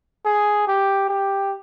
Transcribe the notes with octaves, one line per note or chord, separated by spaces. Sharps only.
G#4
G4
G4